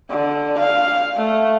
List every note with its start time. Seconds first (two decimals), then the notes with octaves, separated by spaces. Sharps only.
0.10 D3
0.59 F5
1.16 A3